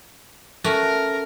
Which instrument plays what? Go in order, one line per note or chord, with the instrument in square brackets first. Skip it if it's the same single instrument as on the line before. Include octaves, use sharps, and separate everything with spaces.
[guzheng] A3 C#4 F#4 [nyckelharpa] A#4